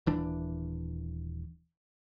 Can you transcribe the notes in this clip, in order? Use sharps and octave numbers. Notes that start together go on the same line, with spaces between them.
D#1 E3 D4